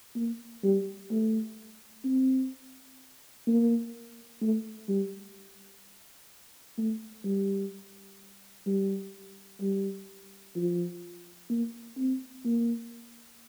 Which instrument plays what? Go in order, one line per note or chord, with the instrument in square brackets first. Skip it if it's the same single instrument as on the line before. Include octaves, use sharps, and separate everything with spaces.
[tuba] A#3
G3
A3
C4
A#3
A3
G3
A3
G3
G3
G3
F3
A#3
C4
A#3